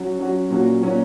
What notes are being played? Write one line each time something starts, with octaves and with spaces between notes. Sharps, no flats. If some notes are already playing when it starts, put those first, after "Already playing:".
Already playing: F#3 C#4 F#4
F#3 C#4 F#4
A#2 F#3 C#4 F#4
A#2 F#3 C#4 F#4